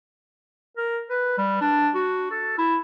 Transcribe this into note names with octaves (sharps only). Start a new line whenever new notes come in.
A#4
B4
G3
D4
F#4
A4
E4